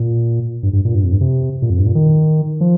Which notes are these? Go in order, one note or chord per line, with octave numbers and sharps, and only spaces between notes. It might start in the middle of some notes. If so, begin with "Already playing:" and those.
Already playing: A#2
G2
G2
A#2
G2
F2
G2
C3
A#2
F2
G2
A#2
D#3
F3